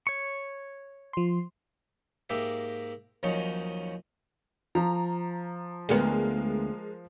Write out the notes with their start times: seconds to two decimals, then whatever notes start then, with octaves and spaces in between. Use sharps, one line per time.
0.07 C#5 C#6
1.13 F3 C6
2.30 G#2 A#3 G4 E5
3.23 D#2 F3 F#3 C#4 D#4
4.75 F3 A#5
5.89 D2 G#3 B3 A#4